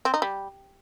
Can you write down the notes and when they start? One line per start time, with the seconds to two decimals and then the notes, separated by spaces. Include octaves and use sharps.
0.05 C4
0.14 D#4
0.22 G3